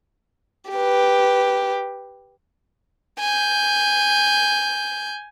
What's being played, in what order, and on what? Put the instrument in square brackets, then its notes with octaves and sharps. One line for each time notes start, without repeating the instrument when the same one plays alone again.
[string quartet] G4 B4
[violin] G#5 G6